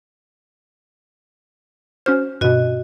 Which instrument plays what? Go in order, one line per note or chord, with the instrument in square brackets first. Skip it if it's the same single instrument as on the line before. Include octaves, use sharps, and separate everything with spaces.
[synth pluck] C#4 F#4 C5 [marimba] F6
[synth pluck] G2 B2 [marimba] F#4 D#5